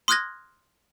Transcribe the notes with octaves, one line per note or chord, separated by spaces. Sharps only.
C6 D#6 F6 F#6 G#6 A#6